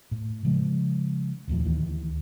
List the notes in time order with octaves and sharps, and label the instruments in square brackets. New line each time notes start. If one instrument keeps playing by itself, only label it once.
[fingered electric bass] A2
C#3 F3 G#3
D#1 D#2 A2 F3
D2 D#3 E3